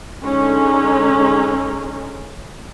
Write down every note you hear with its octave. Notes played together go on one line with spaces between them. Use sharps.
D3 G#3 C#4 D#4